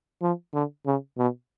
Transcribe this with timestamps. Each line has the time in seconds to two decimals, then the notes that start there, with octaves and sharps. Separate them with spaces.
0.22 F3
0.54 D3
0.86 C#3
1.18 B2